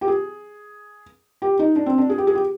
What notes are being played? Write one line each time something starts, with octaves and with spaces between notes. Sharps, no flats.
G4
G#4
G4
D#4
D4
C4
D4
G#4
G4
G#4
G4